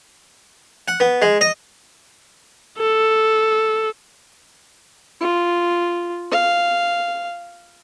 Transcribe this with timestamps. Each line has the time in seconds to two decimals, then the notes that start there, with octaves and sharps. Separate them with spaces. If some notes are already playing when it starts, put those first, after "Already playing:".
0.88 F#5
1.00 B3
1.22 G#3
1.41 D#5
2.78 A4
5.20 F4
6.31 F5